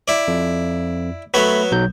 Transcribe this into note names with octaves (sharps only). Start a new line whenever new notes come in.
E4 D5
F2
F#3 A3 B3 C#5 B5
B1 F#3 G6